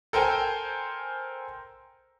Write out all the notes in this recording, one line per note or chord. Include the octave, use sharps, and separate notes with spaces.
A4 A#4 C5 G5 G#5